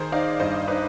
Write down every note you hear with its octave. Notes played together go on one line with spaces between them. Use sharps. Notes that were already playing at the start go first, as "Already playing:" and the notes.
Already playing: D#3 G#4 C5
D#4 D5 F5
G2 C5 D#5
D#4 B4 D5